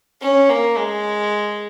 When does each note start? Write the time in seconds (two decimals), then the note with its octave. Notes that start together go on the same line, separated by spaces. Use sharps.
0.22 C#4
0.49 A#3
0.78 G#3